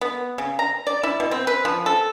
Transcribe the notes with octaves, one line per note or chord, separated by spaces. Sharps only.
B3
C#3
A#5
D5
E4
B2
C4
B4
F3
A4